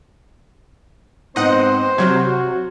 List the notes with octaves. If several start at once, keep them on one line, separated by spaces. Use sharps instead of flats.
G#2 B3 C4 D#4 C5 D#5 F#5
C3 F#3 F#4 F6 G6 G#6